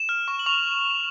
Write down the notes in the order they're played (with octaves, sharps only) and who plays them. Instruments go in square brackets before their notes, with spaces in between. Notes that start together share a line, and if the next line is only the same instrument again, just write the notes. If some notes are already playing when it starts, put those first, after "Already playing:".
Already playing: [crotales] E7
F6
C#6
F#7
C#6 F7